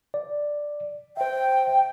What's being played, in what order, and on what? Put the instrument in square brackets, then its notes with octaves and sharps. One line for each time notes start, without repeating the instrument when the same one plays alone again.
[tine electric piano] D5
[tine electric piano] C5 E5 [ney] G5